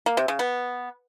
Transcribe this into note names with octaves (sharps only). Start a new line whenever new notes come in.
A#3
C3
C#3
B3